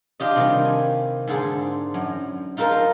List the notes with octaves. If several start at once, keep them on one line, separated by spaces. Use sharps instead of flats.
D4 F4 G4 D#5
C3 D#3 G3
G#5
G#2 D3 G#4 A4 C5
F#2
D#4 F4 A4 A#4 C5